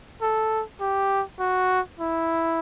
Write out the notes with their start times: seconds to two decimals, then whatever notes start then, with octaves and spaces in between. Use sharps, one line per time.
0.22 A4
0.81 G4
1.39 F#4
1.99 E4